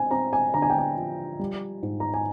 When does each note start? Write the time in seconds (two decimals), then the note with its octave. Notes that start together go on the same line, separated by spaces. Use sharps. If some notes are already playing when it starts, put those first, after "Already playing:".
Already playing: C4 G#5
0.11 C4 A#5
0.33 G#5
0.54 D3 A#5
0.62 G#5
0.70 G5
0.78 G#5
0.97 F3
1.39 G3
1.83 G#2
2.00 A#5
2.14 G#5